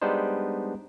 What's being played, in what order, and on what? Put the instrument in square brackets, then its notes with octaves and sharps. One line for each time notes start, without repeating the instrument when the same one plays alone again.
[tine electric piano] G3 G#3 B3 D4 D#4 C5